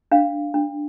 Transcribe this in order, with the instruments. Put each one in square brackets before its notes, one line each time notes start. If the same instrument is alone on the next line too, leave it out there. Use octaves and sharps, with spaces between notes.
[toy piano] D4 F5
D4